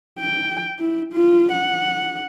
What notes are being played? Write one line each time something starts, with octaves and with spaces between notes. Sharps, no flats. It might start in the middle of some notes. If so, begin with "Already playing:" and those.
G5
E4
F4
F#5